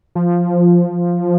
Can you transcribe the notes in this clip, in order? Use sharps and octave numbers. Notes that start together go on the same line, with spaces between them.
F3